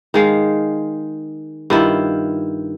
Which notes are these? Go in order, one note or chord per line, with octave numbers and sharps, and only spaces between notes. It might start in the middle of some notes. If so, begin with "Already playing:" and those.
D#3 G#3 F5
G2 D#3 E4 F4